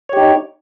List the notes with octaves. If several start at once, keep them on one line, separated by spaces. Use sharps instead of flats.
D#4 G4 C#5